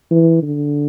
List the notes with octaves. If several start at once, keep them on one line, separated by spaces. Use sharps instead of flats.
E3
D3